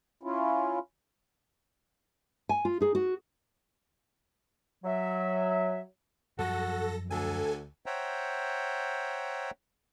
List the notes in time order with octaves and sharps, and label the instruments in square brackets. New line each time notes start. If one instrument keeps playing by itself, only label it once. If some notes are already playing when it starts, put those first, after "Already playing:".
[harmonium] C#4 E4 F4
[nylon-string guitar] G#5
F4
D#4 G#4
F#4
[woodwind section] F#3 E5
[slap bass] F#2 F3 G3 [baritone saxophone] F#4 [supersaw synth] A4 A#6
[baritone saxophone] D2 [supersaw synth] A4 G#5
[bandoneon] C5 C#5 E5 F#5 G5 A#5